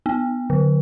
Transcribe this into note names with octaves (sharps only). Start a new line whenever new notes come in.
B3
D3